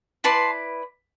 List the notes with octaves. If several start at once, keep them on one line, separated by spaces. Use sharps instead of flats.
E4 B4 D5 A5 C6